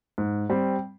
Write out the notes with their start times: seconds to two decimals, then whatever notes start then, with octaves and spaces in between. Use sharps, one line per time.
0.18 G#2
0.50 G3 C4